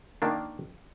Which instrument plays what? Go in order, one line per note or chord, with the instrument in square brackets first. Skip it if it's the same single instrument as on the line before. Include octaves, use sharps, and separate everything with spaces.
[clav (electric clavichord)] D#3 A#3 D4